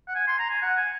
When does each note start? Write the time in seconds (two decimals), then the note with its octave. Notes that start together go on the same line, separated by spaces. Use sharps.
0.08 F#5
0.15 G#5
0.27 C6
0.39 A#5
0.50 G#5
0.62 F#5
0.77 G#5